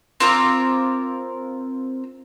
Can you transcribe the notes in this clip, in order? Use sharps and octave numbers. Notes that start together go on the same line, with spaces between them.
C4 F4 A#4 D6